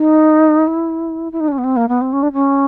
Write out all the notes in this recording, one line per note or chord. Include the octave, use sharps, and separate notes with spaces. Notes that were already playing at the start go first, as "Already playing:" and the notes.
Already playing: D#4
E4
E4
D#4
D4
C#4
B3
C4
A#3
B3
C4
C#4
D4
C#4